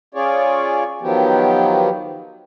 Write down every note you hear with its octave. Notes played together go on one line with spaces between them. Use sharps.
C#4 F4 G#4 C#5 D5
D#3 F3 F#3 B3 G4